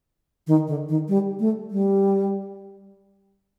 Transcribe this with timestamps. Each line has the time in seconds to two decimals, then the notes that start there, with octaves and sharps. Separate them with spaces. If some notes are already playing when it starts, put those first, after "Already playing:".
0.47 D#3
0.67 D3
0.89 D#3
1.08 G3
1.39 A3
1.71 G3